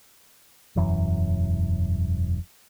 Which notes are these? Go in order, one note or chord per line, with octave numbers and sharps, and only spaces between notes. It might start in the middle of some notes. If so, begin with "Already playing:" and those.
E1 F#2 E3 F#3